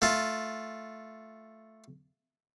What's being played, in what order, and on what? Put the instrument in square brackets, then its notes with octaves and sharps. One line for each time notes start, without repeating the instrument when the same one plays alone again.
[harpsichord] A3 F4